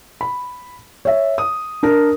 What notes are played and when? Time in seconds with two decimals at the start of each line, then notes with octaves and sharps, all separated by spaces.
0.21 B5
1.05 C#5 E5
1.38 D#6
1.83 D4 A#4